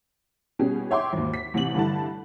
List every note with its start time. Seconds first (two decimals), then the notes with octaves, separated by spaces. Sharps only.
0.59 B2 G3 C#4 G4 G#4
0.91 C#5 E5 G5 C6 D6
1.13 G#1 D#2
1.34 B6
1.54 A1 C3 F#7
1.75 G2 D3 E4 A5